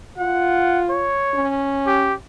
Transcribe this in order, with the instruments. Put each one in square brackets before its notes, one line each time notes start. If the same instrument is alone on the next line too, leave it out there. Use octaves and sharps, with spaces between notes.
[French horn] F4 [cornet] F#5
[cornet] C#5
[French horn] C#4
[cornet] G4